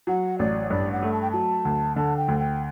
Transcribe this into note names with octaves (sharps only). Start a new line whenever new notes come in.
F#3 F#5
A1 D5
G2 D5
F#5
A3
A5
G5
F#3 A5
D2
D3 A5
G5
D2
G5